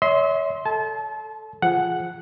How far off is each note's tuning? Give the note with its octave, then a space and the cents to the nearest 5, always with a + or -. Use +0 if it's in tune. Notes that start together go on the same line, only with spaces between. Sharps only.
C#5 +30 E5 -40 C6 +0
A4 +0 A5 -30
F3 -5 G#4 +0 F#5 +0